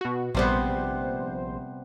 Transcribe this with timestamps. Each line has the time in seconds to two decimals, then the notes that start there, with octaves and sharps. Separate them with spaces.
0.01 B2 F#4
0.35 A#1 C3 G3 B3 C5